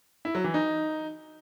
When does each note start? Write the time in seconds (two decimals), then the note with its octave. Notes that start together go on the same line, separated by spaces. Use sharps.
0.25 E4
0.35 F#3
0.44 E3
0.54 D#4